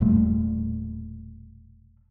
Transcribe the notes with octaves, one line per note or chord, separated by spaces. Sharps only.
E1 A#2 G3 A3